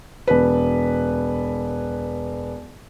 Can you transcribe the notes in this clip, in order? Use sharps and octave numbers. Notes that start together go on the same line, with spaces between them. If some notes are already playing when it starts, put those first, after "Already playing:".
E1 B4